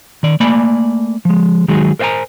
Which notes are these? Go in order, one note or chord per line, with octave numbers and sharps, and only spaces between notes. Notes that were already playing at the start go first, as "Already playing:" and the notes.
D#3 D5
A3 A#3 D5 G#5 B5
F3 G#3
D#3 F#3 G#3 D#4 F#4 G#4
A#4 C5 E5 G5 G#5 A#5